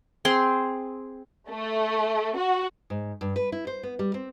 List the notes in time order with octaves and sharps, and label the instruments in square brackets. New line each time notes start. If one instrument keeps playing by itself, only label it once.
[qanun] C4 G#4 C6
[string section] A3
F#4
[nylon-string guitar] G#2
G2
B4
E4
C5
B3
G3
C4